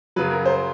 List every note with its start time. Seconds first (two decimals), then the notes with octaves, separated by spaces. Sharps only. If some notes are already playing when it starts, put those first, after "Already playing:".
0.16 F#2 C#3 F#3 B4
0.31 A#4
0.46 C5